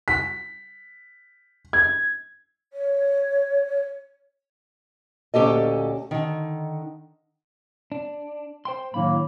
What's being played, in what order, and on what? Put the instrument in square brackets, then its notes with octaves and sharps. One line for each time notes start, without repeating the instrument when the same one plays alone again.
[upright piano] B6
[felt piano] G#6
[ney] C#5
[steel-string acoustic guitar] D2 A#2 C#4 G4 A4 D#5
D3 D#3
[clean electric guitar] D4
C5 G5 C6
[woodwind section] A2 F#3 A#3 [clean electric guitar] D#3 D4 B5